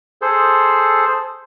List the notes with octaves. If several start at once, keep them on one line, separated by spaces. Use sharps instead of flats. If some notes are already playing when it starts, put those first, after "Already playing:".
G#4 A4 C5